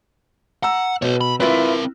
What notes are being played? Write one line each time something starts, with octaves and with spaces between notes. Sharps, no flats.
F#5 A#5 E6
B2 B4 C#5
B5
C4 E4 F4 A#4 B4